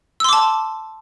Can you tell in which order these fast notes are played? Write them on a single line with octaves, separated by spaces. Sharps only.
E6 C6 D6 A5